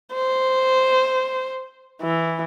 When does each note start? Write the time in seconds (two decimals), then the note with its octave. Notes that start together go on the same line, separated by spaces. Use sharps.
0.14 C5
2.02 E3